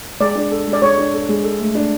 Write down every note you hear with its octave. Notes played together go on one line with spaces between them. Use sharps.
G#3 D5
D4
A4
G#3
D5
G#3 C#5
D4
A4
G#3
A4
A3
D4